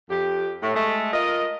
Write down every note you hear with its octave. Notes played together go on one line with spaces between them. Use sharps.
F2 G4
A2
G#3 A3
F4 A#4 D#5